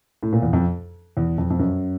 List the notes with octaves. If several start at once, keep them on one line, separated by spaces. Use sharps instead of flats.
A2
A#2
E2
F2
E2
F2
F2
F#2